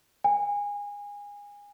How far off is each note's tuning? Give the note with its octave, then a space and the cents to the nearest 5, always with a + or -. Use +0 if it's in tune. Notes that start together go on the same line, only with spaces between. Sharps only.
G#5 -25